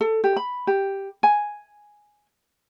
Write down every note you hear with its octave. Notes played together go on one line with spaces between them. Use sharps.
A4
G4
B5
G4
G#5